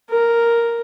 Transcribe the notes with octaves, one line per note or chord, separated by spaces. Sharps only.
A#4